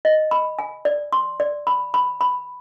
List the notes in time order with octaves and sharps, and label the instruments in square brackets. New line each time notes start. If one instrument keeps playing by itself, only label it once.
[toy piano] D#5
B5
G#5
D5
C6
D5
B5
B5
B5